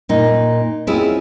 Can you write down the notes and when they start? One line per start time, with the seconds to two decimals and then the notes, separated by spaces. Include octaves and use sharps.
0.09 A#2 D#4
0.87 C4 C#4 E4 F4 G#4